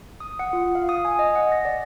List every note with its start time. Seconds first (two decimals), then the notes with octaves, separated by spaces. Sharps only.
0.20 D#6
0.39 F#5
0.53 F4
0.75 F5
0.89 D#6
1.05 G#5
1.19 D#5
1.35 F#5
1.52 A#6
1.65 D5